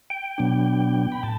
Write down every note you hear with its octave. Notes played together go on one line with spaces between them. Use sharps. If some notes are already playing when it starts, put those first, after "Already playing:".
G5
B2 F#3 B3 D4
B5
A2 A5